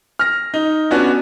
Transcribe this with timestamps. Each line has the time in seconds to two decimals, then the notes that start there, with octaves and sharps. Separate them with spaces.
0.19 F6 A#6
0.54 D#4
0.91 B3 C#4 D4 F#4